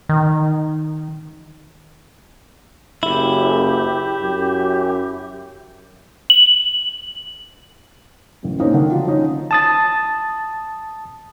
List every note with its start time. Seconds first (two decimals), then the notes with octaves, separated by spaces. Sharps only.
0.09 D#3
3.03 F#1 E4 G4
4.21 F#2
6.30 F#7
8.43 A1 F#2
8.60 A#3 C4 C#4 D#4
8.74 D3 D#3
8.91 F3 F#3 F4
9.07 D#3 C#4 D#4
9.51 A5 D#6 A6